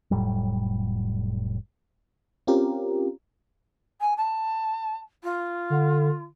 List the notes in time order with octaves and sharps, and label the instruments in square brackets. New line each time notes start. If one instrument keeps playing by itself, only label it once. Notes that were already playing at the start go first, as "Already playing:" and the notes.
[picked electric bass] F1 A2 F#3 G3
[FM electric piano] C4 C#4 F4 G4 A#4
[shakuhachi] G#5
A5
F4
[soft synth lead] D3